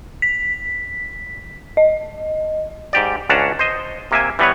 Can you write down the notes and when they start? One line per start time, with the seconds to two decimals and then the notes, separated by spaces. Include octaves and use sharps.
0.22 B6
1.77 D#5
2.93 G#2 G4 D5
3.30 C#2 C#4 D4 F#5 A5 A#5
3.59 C5 D#5
4.11 C3 A#3 E5 G#5
4.39 E3 G3 B3 B4 C#5